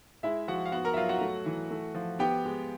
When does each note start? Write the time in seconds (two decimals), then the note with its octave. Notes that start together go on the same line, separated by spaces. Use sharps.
0.23 G#3 E4 E5
0.48 F3 F#4 F#5
0.65 F5
0.72 B3 F#4 F#5
0.85 A#4 A#5
0.94 E5
0.96 F#3 F4 F5
1.09 F#4 F#5
1.21 A3
1.46 E3
1.71 A3
1.95 F3
2.19 B3 G4 G5
2.45 G#3